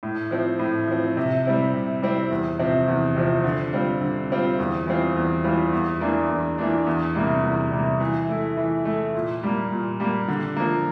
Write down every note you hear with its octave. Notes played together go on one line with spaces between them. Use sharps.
A2
F3 C4
A2
F3 C4
C3
G3 C4 E4
C3
G3 C4 E4
E2
C3 F3 C4
E2
C3 F3 C4
D3
G3 C4 F4
D3
G3 C4 F4
E2
E3 G3 C4 F4
E2
E3 G3 C4 F4
E2
E3 A#3 D4
E2
E3 A#3 D4
E2
C3 G3 A#3
E2
C3 G3 A#3
E3
A3 E4
E3
A3 E4
A#2
G3 A#3
A#2
G3 A#3
D3
F3 A#3